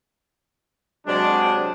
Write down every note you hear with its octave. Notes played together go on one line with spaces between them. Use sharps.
C3 F#3 G#3 D4